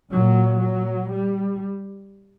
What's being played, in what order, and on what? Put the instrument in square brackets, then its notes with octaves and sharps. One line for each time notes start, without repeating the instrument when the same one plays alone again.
[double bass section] A#2 F#3
F#3
G3